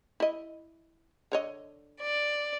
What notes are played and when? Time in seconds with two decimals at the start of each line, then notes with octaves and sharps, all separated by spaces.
0.20 E4 D#5
1.32 D3 C#5 D#5
2.01 D5